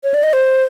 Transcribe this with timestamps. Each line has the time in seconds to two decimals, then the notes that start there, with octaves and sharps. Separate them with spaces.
0.04 C#5
0.14 D5
0.23 D#5
0.33 C5